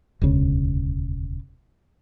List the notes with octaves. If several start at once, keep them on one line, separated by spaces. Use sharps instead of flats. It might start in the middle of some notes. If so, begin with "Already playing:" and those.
E1 D2 C#3